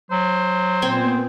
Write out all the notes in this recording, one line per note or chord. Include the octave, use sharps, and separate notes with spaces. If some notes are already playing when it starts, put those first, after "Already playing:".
F#3 C5
A#2 B3 C4 G5 G#5